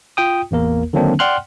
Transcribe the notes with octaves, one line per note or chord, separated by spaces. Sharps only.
F4 G5 D#6
A1 E2 A#3 A#4
D3 D#3 F#3 A#3 C4 D4
D5 F#5 G5 C6 F6 F#6